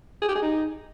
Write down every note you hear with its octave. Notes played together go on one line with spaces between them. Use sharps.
G#4
G4
G#4
D#4